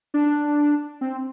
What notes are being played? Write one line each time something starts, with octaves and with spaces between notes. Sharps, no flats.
D4
C4